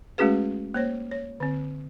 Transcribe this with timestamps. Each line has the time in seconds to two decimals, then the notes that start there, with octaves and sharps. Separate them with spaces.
0.18 G#3 A3 C#4 F#4 G#4 B4
0.74 A#3 C5 C#5
1.11 C#5
1.40 D3 C4